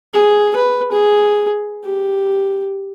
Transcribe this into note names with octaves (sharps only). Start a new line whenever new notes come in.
G#4
B4
G#4
G4